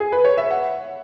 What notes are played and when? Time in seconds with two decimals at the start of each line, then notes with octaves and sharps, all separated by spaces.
0.00 G#4
0.12 B4
0.25 C#5
0.37 E5
0.51 F#5